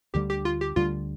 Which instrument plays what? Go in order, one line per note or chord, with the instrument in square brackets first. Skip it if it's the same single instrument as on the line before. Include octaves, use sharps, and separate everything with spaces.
[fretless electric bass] D2 D3 G3 [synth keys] G4
[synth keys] G4
F4
G4
[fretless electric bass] D2 D3 G3 [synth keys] F4